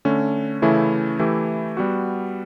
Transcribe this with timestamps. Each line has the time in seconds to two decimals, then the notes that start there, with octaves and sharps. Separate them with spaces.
0.05 D3 A3 C#4
0.62 C#3 E3 A3 C#4 E4
1.19 E3 A3 E4 G4
1.77 G3 B3 F#4